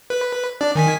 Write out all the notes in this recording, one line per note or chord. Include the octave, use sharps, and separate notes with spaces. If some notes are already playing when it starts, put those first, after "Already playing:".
B4
D4 D5
D#3 G#5 B6